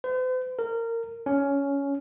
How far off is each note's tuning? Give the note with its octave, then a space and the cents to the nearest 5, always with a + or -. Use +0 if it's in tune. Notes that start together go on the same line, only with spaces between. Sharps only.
C5 -45
A#4 -20
C#4 +15